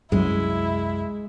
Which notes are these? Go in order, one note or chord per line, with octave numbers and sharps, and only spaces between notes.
C2 F#2 F#3 G#3 E4